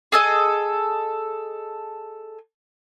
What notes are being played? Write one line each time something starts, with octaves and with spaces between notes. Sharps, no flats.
G#4 A4 D#5